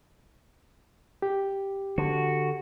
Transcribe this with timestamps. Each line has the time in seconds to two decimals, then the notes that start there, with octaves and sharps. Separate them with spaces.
1.22 G4
1.98 D3 F#4